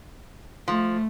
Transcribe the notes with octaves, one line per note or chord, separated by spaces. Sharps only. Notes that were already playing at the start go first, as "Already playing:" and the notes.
F3 A3